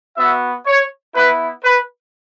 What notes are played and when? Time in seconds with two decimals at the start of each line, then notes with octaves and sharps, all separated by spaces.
0.17 B3 F#4 E5
0.66 C#5
1.15 B3 E4 B4
1.63 B4